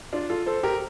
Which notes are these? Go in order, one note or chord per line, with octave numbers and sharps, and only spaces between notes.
D4 F4
F4 A4
A4 C5
G4 A#4